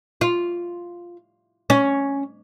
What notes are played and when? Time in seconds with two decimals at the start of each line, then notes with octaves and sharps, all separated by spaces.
0.21 F4
1.70 C#4